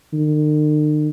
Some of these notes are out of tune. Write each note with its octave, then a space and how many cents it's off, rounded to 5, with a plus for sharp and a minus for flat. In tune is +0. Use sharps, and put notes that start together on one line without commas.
D#3 -45